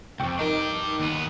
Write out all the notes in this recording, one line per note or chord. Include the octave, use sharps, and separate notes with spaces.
C2 F2 G5 C#6 D6
D4 D#4 G4 A#4
D#2 B3